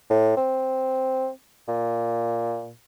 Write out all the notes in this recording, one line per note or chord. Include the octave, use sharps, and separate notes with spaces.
A2
C4
A#2